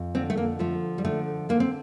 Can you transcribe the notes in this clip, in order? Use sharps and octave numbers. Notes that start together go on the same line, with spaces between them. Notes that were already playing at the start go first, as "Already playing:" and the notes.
Already playing: F2
D3 C4
A3
A#3
F3 A3
G3
D3 A3
D3 A#3
C4